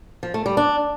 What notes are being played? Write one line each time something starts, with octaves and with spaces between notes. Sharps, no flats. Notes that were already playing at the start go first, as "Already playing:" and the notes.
F3
A3
G3
D4